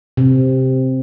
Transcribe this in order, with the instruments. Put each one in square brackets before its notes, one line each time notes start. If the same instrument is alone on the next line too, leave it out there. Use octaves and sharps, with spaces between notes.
[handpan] C3